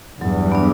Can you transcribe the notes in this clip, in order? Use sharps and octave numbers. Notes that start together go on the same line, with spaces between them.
E2 G2 F#3
B3 D4